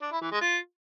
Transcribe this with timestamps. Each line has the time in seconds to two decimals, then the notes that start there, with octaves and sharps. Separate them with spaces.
0.02 D4
0.12 E4
0.21 E3
0.31 G#3
0.41 F4